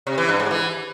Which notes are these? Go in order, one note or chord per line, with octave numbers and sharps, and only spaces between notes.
C3
E3
G2
G#2
E3